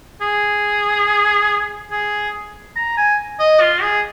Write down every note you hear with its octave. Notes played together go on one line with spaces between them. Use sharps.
G#4
G#4
A#5
G#5
D#5
F4
G#4